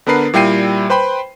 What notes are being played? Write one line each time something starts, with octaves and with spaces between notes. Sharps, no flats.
D3 B3 D4 A#4 B4 C7
A#2 G3 E4 G5 C7 D#7
B4 C5 G5 B5 C6